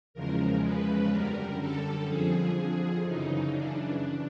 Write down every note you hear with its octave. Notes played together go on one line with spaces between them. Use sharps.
E2 C#3 F3 G#3 A#4
B4
F#2 D3 G3 A#4
A4
F2 D3 F3 G#4
G#4
F#2 C#3 E3 D#4
D4